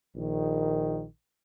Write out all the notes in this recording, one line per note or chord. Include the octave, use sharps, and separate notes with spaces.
A#1 D#3